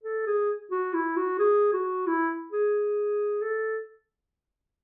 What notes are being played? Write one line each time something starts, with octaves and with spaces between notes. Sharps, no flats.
A4
G#4
F#4
E4
F#4
G#4
F#4
E4
G#4
A4